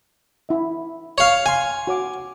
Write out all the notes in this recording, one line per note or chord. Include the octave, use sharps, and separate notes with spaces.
E4 E5
C#5 F5
F5 G#5 C6
F#4 C#5 D6